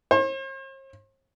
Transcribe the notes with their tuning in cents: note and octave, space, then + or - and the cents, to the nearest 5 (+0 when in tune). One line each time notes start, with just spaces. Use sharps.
C5 +45